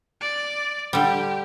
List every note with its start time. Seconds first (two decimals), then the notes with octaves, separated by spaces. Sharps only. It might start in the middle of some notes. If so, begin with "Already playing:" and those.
0.21 D5
0.93 D3 G3 G4